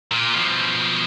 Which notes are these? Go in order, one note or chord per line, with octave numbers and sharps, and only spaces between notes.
A#2 F4
B2 F3